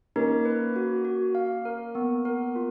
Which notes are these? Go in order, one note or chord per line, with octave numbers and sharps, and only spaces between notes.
A#3 C#4 D#4
B4
F#4
F#4
F5
A#4
B3
A#4
F4